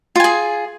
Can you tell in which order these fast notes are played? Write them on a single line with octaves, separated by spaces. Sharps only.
F4 G#5 G#4